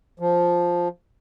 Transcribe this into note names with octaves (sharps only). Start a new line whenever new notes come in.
F3